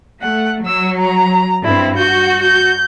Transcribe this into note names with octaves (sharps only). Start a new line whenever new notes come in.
A3 F#5
F#3 E6
A#5
G2 C4 E4
F#4 G6
G6